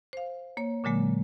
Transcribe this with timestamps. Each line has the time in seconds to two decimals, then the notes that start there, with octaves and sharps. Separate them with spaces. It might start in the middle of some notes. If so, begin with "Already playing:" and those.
0.13 C5 F5
0.57 A#3 C#5
0.84 A#2 D3 F#3 G#3 A#3